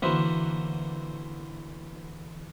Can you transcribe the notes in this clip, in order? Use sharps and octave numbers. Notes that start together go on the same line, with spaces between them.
D3 E3 A#3 F#4 C5 E5